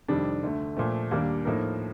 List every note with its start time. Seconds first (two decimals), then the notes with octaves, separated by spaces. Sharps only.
0.08 F2 C3 D#3 G3 D4
0.43 D2 D3 A3
0.77 A#2 F3 A3
1.11 D#2 D#3 G3 A#3 D4
1.45 A2 F3 A#3 D#4 A#4